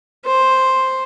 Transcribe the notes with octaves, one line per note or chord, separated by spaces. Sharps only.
C5